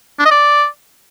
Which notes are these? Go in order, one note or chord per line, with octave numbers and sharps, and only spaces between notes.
D4
D#5
D5